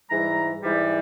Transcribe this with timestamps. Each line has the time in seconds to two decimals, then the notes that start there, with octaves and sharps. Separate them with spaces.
0.10 G#2 E3 G3 A#5
0.63 G#2 E3 G3